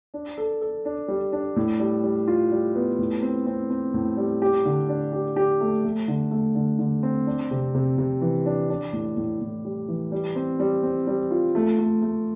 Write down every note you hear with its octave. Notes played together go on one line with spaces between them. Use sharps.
D4
A4
A4
D4
G3
D4
A2
G3
G3
F4
G3
B3
A2
C4
C4
C4
A2
G3
G4
D3
D4
G4
G4
A3
A3
D3
A3
D3
D3
C4
D4
C3
C3
C3
E3
D4
D4
A2
A2
A2
G3
E3
G3
C4
G3
C4
G3
F4
A3
A3
A3